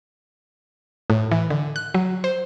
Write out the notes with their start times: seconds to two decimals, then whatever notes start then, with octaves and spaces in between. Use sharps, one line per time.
1.10 A2
1.31 E3
1.50 D3
1.76 F#6
1.94 F#3
2.24 C5